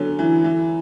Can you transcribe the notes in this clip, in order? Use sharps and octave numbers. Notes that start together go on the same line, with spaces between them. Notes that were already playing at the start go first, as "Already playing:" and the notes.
Already playing: D3 F#3 B3 C#4
E3
E3